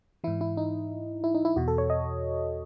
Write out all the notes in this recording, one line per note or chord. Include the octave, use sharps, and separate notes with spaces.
G#2 E3 E4
E4
D#4
E4
D#4
E4
E2 B2 F#4
A4
C#5
D#5